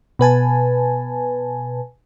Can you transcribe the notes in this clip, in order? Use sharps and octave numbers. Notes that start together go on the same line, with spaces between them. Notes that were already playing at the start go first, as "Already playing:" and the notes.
B2 B4 G#5 A5